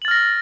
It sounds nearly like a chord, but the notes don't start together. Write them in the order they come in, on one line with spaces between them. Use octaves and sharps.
F#7 A6 F6 A#6